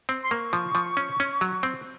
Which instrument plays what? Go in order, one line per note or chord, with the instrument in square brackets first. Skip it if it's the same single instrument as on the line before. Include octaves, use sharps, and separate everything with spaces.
[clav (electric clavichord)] C4
[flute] C6
[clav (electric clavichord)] A#3 [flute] C#6
[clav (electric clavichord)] F3
F3
C#4
C#4
F#3
C4